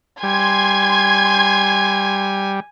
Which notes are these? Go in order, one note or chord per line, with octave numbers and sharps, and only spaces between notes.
G3 G#5 C6 G#6